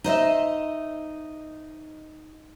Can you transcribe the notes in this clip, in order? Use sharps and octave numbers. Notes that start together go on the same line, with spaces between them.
D#4 C5 D#5 E5